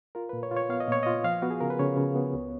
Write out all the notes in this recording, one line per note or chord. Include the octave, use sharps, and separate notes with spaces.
F4 A#4
A#2 B4
C#5
F4
C#5
B3 F5
D#5
A#2 C#5
F4 D#5
F3 F5
B3 F#4
G#4
C#3 A#4
B4
C#3 C#5
C#3
B3
C#2